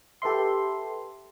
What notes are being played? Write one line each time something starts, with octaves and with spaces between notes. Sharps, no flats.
G4 A4 B4 E5 C6